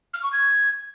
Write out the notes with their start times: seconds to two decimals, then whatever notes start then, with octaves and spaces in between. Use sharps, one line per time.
0.14 F6
0.23 C#6
0.32 G#6